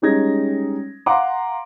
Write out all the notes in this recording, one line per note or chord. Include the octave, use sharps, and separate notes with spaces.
G3 G#3 C#4 D#4 G#6 A#6
F5 F#5 A#5 C6 D6